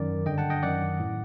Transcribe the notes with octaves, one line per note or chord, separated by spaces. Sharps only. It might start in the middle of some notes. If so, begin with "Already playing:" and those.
Already playing: F#2 D#3 A#4 D5
G2 D3 D#5 G5
F#5 A5
D#5 G5
F#2 D#3 D5 F#5
A2